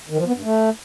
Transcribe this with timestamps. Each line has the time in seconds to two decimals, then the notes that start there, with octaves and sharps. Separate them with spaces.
0.10 D#3
0.18 F3
0.27 B3
0.35 G2
0.44 A3